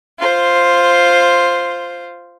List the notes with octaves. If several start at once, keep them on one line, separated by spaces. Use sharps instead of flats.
F4 C5